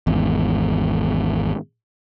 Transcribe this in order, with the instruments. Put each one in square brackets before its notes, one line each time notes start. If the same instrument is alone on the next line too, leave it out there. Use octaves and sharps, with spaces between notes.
[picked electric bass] G#1 E2